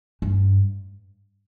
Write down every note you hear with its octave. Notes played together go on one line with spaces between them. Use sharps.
G2